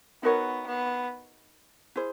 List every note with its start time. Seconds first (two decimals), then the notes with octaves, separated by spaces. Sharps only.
0.23 B3 D#4 F#4 A#4 C#5
0.67 B3
1.96 E4 G#4 C5